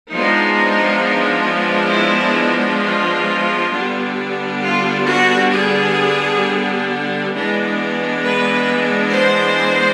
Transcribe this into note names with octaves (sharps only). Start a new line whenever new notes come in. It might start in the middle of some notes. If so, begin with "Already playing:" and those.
F3 G#3 B3 D4 D#4
E4
F4
D3 G3 B3 D4
F4
F#4
G#4
E3 G#3 B3 D4
B4
C5